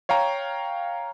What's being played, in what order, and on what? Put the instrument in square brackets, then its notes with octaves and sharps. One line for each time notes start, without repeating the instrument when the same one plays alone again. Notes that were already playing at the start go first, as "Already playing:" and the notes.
[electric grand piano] C#5 F5 G5 A#5